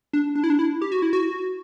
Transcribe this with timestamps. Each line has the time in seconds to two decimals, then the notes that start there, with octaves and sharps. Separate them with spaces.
0.13 D4
0.35 D4
0.44 E4
0.50 D4
0.59 E4
0.82 G4
0.92 F#4
1.02 E4
1.13 F#4